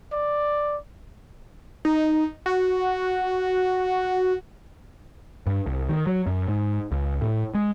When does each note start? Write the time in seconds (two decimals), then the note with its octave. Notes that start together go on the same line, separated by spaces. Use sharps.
0.12 D5
1.85 D#4
2.46 F#4
5.47 G2
5.66 C2
5.89 D#3
6.07 F#3
6.27 F#2
6.48 G#2
6.92 C#2
7.22 A2
7.55 G#3